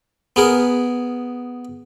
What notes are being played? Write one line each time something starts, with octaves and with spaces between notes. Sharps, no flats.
B3 G#4 A#4